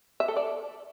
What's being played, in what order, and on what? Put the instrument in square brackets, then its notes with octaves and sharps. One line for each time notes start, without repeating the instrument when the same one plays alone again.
[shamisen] E5
A4
D5